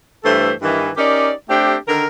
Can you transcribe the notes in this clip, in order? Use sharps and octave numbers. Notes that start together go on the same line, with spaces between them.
G2 E3 A3 A4 C5
G2 D#3 E3
C#4 D#4 G4 A#4 D5
A3 C4 D4 G4
D3 D#3 A#4